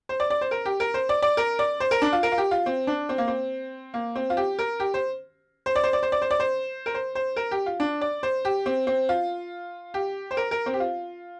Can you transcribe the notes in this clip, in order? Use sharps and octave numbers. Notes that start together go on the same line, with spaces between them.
C5
D5
D5
C5
A#4
G4
A#4
C5
D5
D5
A#4
D5
C5
A#4
D4
F4
A#4
F4
G4
F4
C4
D4
C4
A#3
C4
A#3
C4
F4
G4
A#4
G4
C5
C5
D5
C5
D5
C5
D5
C5
D5
C5
A#4
C5
C5
A#4
G4
F4
D4
D5
C5
G4
C4
C4
F4
G4
C5
A#4
A#4
C4
G4
F4